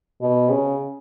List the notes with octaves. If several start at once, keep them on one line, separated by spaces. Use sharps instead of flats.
B2
C#3